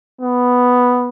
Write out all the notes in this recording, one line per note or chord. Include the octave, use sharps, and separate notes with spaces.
B3